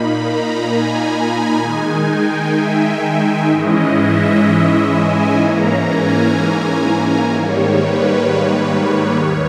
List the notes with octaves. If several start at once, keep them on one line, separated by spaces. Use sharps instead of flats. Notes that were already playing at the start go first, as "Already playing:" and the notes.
Already playing: A#2 A#3 D#4 B5
A#5
G#5
D#3 G#3 D#4
G5
E5
G#2 E3 G#3 C#4 E4 D#5
E5
G#5
G#2 E3 A#3 C#4 A#5
G#5
G#2 D#3 G3 A#3 C#5
B4
C#5
D#2 D#3